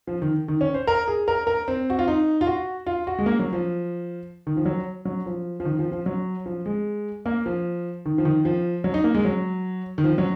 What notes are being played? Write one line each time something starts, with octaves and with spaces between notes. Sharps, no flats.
F3
D#3
D#3
C#4
C5
A#4
G#4
A#4
A#4
C4
F#4
F4
D#4
F4
F#4
F4
F#4
G#3
A#3
F#3
F3
D#3
F3
F#3
F#3
F3
F3
D#3
F3
F3
F#3
F3
G#3
A#3
F3
D#3
F3
D#3
F3
F#3
D#4
A#3
G#3
F#3
D#3
F3
F#3